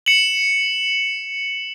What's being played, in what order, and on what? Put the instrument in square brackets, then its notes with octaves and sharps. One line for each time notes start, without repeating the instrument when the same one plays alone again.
[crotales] C#7 E7 F#7